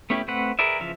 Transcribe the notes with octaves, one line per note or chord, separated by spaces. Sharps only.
A3 B3 C#4 E4 G4
A3 C4 B4 F#5
G#4 A#4 B4 D5 E5
C#3 E3 F3 E5 F5